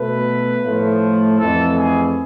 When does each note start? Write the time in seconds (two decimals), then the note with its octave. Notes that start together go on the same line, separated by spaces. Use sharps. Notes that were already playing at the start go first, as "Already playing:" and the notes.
Already playing: B2 A3 B4
0.62 A2 F3 A3
1.38 F2 E3 A3 A4
1.77 G#4